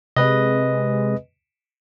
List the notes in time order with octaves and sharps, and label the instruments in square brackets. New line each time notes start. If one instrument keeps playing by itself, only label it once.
[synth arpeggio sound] C3 G#3 [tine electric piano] B4 D#5